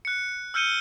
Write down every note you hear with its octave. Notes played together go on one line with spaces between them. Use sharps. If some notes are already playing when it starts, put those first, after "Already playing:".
F#6 C#7
E6 F6 G6 C#7 D#7 G7